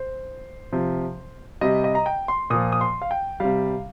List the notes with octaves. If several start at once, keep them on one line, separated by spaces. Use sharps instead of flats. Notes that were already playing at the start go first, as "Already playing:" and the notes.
Already playing: C5
C3 F3
C3 G3 D#5
D#5
A#5
G5
C6
A#2 F3 D#6
D#6
C6
F5
G5
C3 G3 F5